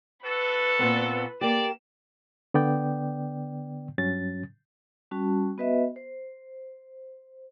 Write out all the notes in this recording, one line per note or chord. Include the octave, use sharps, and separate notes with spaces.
F#4 A4 B4
A#2 B3 C4
A#3 G4 D5 E7
D3 B3 D5 G5
G2 F#3 C#4 A6
G3 C#4 F#4 A5
B3 F#4 B4 D#5 E5
C5